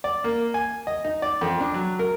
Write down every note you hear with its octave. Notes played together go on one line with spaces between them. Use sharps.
D5
A#3
G#5
D#5
D#4
D5
F2
D4
F#3
A#4